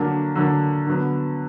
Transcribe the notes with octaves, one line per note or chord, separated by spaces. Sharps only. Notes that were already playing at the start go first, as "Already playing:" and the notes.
Already playing: D3 F#3 A#3 D4
D3 F#3 A#3 D4
D3 F#3 B3